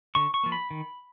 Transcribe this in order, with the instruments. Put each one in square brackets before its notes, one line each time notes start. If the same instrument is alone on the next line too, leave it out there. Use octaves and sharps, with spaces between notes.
[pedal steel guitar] D3 C#6
C#6
F3 A#3
B5
D#3